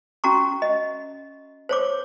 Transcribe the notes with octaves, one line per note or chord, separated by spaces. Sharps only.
C#4 F#4 A#5 C#6
D#5
C5 C#5 D6